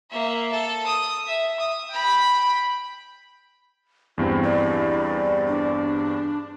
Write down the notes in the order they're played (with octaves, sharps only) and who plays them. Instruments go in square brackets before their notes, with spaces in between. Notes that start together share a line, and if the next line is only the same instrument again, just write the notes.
[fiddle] A#3 E5
A4
D#6
E5
D#6
G5 B5
[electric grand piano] E2 G2 C4 [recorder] E4
[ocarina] D5
[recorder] D4